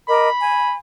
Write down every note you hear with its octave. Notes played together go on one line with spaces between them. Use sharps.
A#4 D#5 B5 D6
G#5